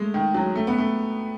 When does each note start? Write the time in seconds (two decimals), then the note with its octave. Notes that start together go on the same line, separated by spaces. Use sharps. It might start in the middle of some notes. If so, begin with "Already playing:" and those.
Already playing: G#3 A3
0.14 D#3
0.34 F#3
0.56 A3
0.67 B3
0.78 A3